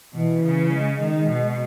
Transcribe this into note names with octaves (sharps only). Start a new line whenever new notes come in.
B2 E3
C#3
G#3
D#3
B2